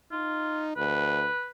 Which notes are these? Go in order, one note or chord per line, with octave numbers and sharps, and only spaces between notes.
D#4 F4
D2 B4